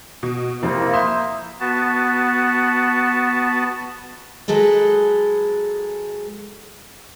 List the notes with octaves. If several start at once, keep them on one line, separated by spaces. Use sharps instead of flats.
B2
F2 C3 A#3 C4 E4 C5
E5 B5 C6 D#6 G6
B3 F#4 A5
F#3 G#3 G#4 A4 B4